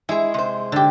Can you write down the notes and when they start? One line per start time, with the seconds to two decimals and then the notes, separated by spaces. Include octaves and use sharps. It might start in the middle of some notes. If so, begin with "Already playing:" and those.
0.09 G#3 E4 G#4
0.34 C3 C5
0.72 D3 G4